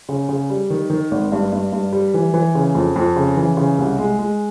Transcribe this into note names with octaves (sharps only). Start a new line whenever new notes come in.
C#3
C#3
G3
D#3
D#3
G#1
G2
G2
G2
G3
E3
E3
C#3
F2
F2
C#3
E3
C#3
C2
G#3
G#3